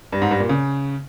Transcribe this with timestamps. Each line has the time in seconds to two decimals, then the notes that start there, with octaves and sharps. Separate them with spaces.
0.12 G2
0.22 G#2
0.31 G2
0.40 A#2
0.49 C#3